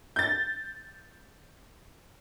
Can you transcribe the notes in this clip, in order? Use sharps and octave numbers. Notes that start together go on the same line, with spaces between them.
G6 A6